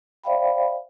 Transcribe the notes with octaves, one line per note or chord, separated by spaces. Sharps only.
C5 D5 E5 F5 G5 B5